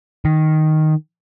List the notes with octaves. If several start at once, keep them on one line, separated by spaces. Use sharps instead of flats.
D#3